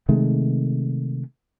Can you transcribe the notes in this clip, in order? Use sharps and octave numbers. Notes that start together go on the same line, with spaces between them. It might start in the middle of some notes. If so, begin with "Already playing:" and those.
C3 D#3 G#3 A3